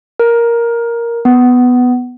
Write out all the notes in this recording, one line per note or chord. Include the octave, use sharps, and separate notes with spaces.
A#4
B3